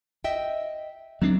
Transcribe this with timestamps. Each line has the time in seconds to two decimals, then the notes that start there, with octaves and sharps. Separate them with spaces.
0.24 D#5 E5 G5
1.22 F#3 A3 C4 D4